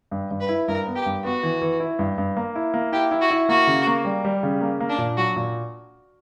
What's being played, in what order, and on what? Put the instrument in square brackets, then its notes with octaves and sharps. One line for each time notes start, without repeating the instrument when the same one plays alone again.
[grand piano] G2
G2
[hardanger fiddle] B4
[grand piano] E4
[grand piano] G2 [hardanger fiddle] A#4
[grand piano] B3
[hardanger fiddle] G4
[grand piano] G2
[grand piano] B3 [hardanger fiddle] F#4
[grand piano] E3
E3
E4
G2
G2
A#3
E4
A#3
[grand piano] E4 [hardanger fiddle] G4
[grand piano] E4
[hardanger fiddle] F#4
[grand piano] E4
[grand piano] A#3 [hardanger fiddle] F#4
[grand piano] C#3
A#3
G3
G3
C#3
A#3
A#3
[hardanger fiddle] D4
[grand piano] A#2
[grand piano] F#3 [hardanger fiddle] F#4
[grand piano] A#2